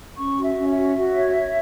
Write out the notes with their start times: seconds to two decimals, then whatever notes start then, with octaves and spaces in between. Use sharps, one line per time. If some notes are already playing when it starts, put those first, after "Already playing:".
0.17 C#4 C#6
0.37 F#4
0.44 E5
0.56 C#4
0.70 E5
0.76 F#4
0.96 F#4
1.16 C#5
1.36 C#5